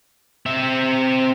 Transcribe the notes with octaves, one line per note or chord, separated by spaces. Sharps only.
C4 E5